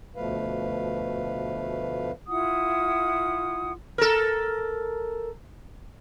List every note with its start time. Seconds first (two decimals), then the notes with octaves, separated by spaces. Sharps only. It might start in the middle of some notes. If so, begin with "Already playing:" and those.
0.16 D2 B2 F3 A3 B4 F5
2.27 E4 F4 F#5 D#6
3.98 A4 A#4